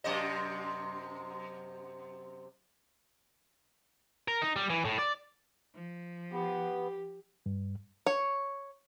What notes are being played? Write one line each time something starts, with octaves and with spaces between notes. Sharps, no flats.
F#2 C3 D#5
A#4
D#4
G3
E3
A2
D5
F3
B3 G4
G2
C#5